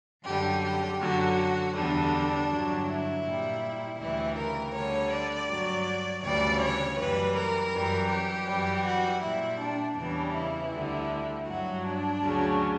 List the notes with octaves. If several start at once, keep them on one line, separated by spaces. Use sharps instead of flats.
F#2 D3 G3 G4
G4
F#2 D3 F#3 F#4
E2 D3 G3 D4
G2 D3 F#3
E4
A#2 G3
D2 C#3 E3 G3 E4
A#4
D2 D3 G3 C#5
D5
G2 F#3
D2 C#3 E3 G3 D5
C#5
F#2 E3 G3 B4
A#4
F#2 E3 G3
G4
F#2 E3 G3
F#4
A#2 G3 E4
D4
E2 C#3 E3 G3 D4
E4
D2 D3 G3
G2 F#3 F#4
D4
D2 C#3 F#3